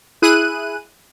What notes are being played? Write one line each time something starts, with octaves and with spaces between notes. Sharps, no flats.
E4 G#4 F#6 D#7